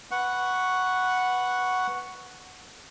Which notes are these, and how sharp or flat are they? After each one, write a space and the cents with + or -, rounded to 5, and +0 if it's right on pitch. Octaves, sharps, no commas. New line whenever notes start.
B4 +0 F#5 +0 C#6 +0